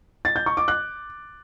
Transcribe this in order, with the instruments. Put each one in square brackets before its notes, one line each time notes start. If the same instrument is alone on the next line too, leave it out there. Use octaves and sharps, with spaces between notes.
[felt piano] A6
G6
C#6
D6
F#6